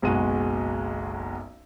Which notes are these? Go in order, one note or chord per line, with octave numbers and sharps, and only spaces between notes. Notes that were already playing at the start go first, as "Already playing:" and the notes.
F#1 B1 G#3 F#4 D#7